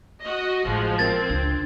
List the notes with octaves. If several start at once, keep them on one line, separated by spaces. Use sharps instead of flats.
F#4 D#5
A1 F3 G#3
C4 A#4 G#6 A6
C#2 D4